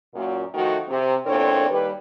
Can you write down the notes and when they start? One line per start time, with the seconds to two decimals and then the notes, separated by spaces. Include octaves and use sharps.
0.14 F#2 A#2
0.54 D#3 F3 A3 F#4
0.88 C3
1.25 E2 A#2 C4 D4 A4 C#5
1.69 D#2 G3 B4